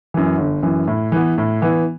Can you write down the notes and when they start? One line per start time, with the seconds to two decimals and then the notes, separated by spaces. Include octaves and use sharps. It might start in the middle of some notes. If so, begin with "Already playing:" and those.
0.14 F#2 E3
0.38 G1
0.63 F#2 E3
0.87 A2
1.12 E3 B3
1.38 A2
1.61 E3 B3